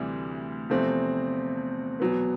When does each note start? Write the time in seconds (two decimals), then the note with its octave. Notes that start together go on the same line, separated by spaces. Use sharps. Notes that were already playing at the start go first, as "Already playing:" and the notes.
Already playing: D2 C3 E3 G3
0.70 E2 C3 F3 A3 C4
2.00 E2 B2 F#3 B3